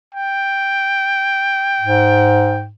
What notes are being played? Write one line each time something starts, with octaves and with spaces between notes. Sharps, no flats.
G5
G#2